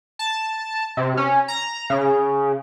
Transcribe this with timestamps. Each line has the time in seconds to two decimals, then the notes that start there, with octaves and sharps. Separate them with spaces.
0.19 A5
0.97 C3
1.17 C#4
1.48 A#5
1.90 C#3